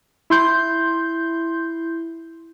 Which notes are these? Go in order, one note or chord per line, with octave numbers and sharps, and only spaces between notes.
E4 C6 G6